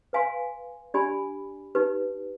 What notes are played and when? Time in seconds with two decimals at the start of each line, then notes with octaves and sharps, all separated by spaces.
0.13 B4 F5 G#5 C6
0.94 D4 G4 D5 G#5 B5
1.75 D#4 G4 B4